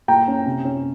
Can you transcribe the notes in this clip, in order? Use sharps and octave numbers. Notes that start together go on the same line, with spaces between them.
A#2 G5 A#5
C#4
C3
C#4